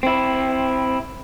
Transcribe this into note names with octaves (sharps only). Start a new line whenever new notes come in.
C4 E4